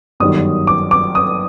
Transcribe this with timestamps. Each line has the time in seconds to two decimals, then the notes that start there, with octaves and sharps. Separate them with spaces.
0.20 G1 F#2 D#3 G3 D#6
0.67 D6
0.91 D6
1.15 D#6